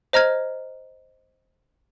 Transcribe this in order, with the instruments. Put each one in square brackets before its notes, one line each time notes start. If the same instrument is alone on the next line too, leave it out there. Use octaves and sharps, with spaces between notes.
[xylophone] C5 D#5 A#5 F6 G#6